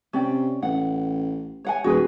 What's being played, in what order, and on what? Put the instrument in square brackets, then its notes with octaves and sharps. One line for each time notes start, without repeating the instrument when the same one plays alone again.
[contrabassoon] C3 [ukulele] C#4 D5 G5
[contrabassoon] A1 [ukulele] F#5
[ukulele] C#5 F#5 G#5
[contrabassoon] D#1 [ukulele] F#4 G#4 B4